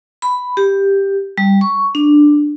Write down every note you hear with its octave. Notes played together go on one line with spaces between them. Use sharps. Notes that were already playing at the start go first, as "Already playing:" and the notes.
B5
G4
G3
C#6
D4